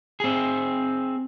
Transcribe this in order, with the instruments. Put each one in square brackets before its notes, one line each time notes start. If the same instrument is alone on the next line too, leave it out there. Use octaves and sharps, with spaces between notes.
[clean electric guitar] C4 G#4